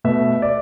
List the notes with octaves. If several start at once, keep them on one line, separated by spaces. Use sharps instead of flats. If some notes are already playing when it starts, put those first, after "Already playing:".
B2 A3 E5
D5